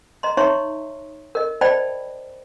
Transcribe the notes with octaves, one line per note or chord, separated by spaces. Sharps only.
D#5 A#5 C6
D#4 C#5 E5 A#5 C6 C#6
A#4 D#5
C5 D5 D#5 G5 A5 B5